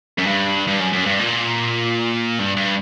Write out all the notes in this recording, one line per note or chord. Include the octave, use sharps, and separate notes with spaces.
F#2
G2
G2
F#2
F#2
G2
A#2
G2
G2